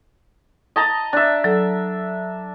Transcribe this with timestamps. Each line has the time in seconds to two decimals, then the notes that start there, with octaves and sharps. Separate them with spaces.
0.76 D#5 A5 A#5
1.13 D4 E5
1.44 F#3 A4